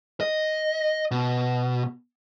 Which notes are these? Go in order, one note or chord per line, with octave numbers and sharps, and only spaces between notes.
D#5
B2